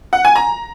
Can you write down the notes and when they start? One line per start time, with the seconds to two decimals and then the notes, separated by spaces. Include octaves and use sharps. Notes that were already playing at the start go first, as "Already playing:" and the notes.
0.13 F#5
0.25 G#5
0.36 A#5